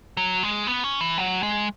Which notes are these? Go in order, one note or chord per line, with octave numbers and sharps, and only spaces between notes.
F#3
G#3
B3
C#4
E3
F#3
G#3